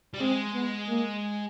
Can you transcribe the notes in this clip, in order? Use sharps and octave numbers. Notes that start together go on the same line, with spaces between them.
G3
G#3 C4
B3
A#3